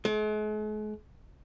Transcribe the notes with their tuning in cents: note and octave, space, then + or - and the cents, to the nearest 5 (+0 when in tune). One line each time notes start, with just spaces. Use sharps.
G#3 +45